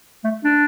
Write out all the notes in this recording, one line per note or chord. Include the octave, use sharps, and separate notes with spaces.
A3
D4